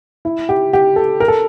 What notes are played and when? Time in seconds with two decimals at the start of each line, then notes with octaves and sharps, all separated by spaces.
0.25 E4
0.49 G4
0.73 G4
0.96 A4
1.20 A#4
1.28 A4